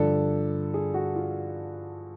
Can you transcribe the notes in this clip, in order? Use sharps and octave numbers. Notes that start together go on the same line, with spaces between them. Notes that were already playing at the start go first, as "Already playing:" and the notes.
Already playing: G2 D3 F3 A4
G#4
F#4
F4